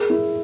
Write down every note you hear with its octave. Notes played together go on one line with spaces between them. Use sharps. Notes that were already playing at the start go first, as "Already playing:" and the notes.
Already playing: G#4 A#4
E4